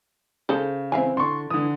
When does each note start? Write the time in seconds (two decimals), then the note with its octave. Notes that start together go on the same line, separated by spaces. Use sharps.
0.49 C#3 G#4 A4 C5
0.92 E3 C4 E5 F5 G#5
1.17 D3 C6 C#6
1.50 D3 E3 D#6